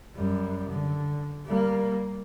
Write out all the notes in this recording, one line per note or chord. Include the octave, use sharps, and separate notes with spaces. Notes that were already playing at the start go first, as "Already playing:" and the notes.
F#2 G3
D3
G3 A#3